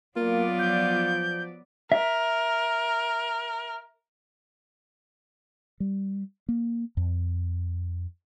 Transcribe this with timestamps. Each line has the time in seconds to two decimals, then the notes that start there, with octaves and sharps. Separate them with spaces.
0.16 F#3 A#3 B3 F4 D5
0.59 F3 G6
1.92 A#4 E5
5.80 G3
6.49 A#3
6.97 F2